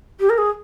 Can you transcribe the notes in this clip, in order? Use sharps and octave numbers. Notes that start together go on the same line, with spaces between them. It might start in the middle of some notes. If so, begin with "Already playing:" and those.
G4
A#4
G#4